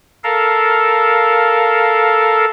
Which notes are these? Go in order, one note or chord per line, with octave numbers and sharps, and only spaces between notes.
A4 A#4 F5